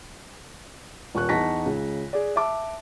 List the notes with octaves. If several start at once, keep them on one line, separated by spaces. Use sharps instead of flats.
D#1 C#6 F#6
E2 D#4 A5 C#6 A#6 B6
C#2 C#3
G#4 D5
E5 A5 D6